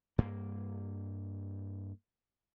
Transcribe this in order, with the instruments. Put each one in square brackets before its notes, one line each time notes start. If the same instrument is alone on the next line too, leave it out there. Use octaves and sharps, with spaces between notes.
[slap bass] G2 A#3